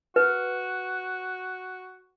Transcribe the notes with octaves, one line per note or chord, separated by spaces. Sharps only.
F#4 B4